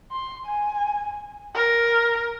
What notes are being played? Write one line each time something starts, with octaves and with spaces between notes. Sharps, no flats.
C6
G#5
A#4